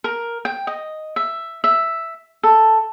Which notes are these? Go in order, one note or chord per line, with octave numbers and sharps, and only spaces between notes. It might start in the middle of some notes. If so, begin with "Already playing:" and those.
A#4
G5
D#5
E5
E5
A4